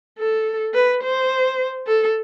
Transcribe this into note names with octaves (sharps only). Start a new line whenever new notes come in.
A4
B4
C5
A4